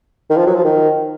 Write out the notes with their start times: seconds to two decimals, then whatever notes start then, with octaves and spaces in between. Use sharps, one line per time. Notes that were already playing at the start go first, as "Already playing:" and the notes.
0.30 D#3
0.37 F3
0.46 F#3
0.55 F3
0.64 D#3